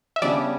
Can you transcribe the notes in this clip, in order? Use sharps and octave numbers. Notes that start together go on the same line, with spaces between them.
E5
C#3 G3 B3 D4 D5